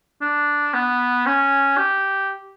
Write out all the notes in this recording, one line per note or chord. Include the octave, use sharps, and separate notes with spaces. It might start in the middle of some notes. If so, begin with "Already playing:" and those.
D4
B3
C#4
G4